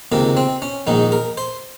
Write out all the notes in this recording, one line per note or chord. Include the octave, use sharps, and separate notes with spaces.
C#2 C3 D#3 A#3
C4
C#4
A#1 G#2 D#3 D#4
A#4
C5